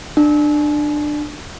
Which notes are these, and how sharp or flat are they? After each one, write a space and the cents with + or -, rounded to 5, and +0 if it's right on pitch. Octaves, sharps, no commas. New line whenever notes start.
D4 +20